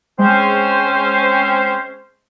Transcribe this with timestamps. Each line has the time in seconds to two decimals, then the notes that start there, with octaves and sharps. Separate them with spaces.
0.19 G#3 C4 C#4 C5